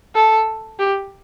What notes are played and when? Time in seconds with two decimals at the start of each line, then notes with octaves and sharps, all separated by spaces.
0.15 A4
0.79 G4